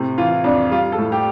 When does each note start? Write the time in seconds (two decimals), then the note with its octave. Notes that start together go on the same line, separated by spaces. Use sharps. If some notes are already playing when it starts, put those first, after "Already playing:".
Already playing: A2 C3
0.18 E3 F4
0.44 F2 D4
0.71 G3 F4
0.92 A4
0.98 A2
1.12 G4